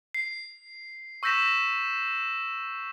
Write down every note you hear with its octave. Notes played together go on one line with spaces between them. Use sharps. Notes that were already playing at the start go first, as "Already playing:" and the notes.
C7
C#6 E6 G6 A#6 B6 E7